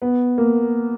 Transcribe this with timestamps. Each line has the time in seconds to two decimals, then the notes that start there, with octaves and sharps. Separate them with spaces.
0.02 B3
0.38 A#3